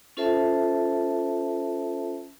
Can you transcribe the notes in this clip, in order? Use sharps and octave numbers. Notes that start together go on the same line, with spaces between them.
C#4 F4 A4 C5 E5 A5